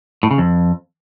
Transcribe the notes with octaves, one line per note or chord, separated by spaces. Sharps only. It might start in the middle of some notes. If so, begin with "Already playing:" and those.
A2
C#3
F2